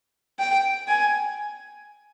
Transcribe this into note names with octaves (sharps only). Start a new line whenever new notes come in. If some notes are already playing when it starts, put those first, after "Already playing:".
G5
G#5